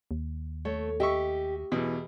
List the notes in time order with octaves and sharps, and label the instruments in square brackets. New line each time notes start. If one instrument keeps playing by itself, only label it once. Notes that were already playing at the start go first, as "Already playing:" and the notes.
[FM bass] D#2
[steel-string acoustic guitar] A3 [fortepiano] C#5
[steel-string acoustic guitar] G4 [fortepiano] D#5 E5 C#6
[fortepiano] E2 B2 [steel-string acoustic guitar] E3